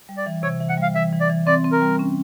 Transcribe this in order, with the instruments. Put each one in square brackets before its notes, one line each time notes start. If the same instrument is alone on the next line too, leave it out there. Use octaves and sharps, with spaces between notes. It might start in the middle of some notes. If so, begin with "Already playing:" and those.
[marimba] G3
[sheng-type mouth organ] D5
[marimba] E3
[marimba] C3 [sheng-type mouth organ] C#5
[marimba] E3
[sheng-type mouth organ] F#5
[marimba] G3
[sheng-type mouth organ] F5
[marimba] E3 [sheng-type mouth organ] E5
[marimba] E3
[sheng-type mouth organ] D5
[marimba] E3
[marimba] C4 [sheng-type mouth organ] D5
[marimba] C4
[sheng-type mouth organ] A#4
[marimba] G3
C#4